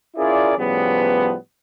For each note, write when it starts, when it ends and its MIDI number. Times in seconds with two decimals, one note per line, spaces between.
0.17 0.53 61
0.17 0.53 64
0.17 0.53 65
0.17 0.53 68
0.17 0.53 70
0.17 0.53 74
0.57 1.33 45
0.57 1.33 49
0.57 1.33 53
0.57 1.33 55
0.57 1.33 59